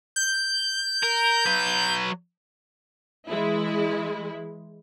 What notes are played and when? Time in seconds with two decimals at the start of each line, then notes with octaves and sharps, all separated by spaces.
0.16 G6
1.03 A#4
1.46 F#3 B4
3.28 E3 G#3 E4